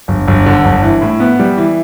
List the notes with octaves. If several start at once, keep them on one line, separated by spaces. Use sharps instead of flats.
G1
G1
D3
G1
E3
A2
B3
G3
E3